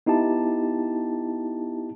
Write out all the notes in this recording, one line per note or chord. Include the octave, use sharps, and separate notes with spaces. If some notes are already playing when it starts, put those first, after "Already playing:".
B3 D#4 E4 G4 A5